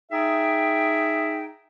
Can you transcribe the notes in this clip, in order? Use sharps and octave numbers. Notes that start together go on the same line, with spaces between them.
D#4 G#4 E5 G5